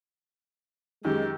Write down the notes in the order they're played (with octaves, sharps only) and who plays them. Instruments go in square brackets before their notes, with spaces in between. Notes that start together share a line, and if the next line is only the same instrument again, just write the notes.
[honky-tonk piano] F#2 D#3 [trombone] G#3 [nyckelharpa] G4